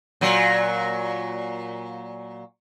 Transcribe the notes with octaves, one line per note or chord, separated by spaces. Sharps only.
A#2 F#3